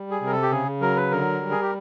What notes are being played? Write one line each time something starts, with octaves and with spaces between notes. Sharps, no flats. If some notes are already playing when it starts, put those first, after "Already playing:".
Already playing: G3
G#4
C3
A#4
A4
G4
C#3 G#4
F#3 A#4
B4
D3 A#4
G3
G#4
G4